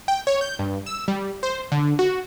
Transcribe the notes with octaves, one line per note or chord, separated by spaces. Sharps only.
G5
C#5
G6
G2
E6
G3
C5
D3
F#4